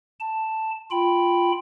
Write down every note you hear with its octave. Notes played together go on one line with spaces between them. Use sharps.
A5
F4 G5 B5